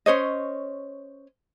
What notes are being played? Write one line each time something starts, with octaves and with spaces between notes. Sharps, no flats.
C#4 C5 C#5 D#5